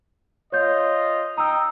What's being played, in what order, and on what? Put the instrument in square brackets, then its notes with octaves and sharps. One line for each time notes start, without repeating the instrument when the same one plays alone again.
[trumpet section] F4 D#5 [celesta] C#5 G6
[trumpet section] D#4 G5 D#6 [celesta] A#5 E6